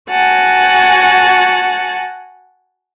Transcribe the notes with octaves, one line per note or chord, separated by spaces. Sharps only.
F#4 F#5 G#5 A5